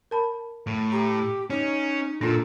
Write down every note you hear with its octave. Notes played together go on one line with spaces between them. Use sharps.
A#4 A5 B5
A2
G4 A#5
C#4 D#4
A#2 D4 F4 A4